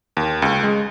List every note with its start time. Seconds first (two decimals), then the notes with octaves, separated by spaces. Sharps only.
0.17 D#2
0.42 C#2
0.63 G#3